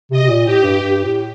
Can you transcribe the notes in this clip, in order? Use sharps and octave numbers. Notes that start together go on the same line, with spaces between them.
C3 D#5
C3
A#2
A2 G4
G2
G2
A2